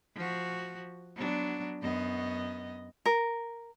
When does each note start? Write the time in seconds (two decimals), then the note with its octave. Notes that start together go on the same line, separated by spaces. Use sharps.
0.15 F3 F#4
1.16 F#3 B3 D4
1.82 F#2 B3 D#5
3.06 A#4